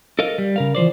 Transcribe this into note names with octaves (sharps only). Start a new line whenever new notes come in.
A4 A#4 D#5 F5
G3
C#3 A#4 F5
E3 F3 C5 D5